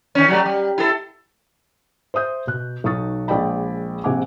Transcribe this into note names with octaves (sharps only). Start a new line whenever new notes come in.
D#3 C#4
F#3 G3 A3
G3
E4 A4
C5 E5 D#6 G6
B2 F#6
B1 B2 D#4 C#6 D#6 A6
A#1 G#3 D5 D#5 G5 B5
A#1 C3 G#4 F#5 G#5 D6